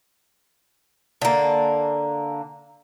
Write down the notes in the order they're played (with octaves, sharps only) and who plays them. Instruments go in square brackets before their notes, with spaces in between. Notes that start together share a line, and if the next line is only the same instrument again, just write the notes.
[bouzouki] D3 A#3